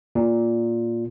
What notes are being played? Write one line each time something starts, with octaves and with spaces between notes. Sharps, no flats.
A#2